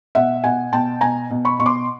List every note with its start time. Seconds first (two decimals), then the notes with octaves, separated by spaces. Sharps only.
0.15 B2 E5 F#5
0.44 B2 F#5 G#5
0.72 B2 G5 A5
1.01 B2 G#5 A#5
1.30 B2
1.45 B5 C#6
1.59 B2 C#6
1.66 C6 D6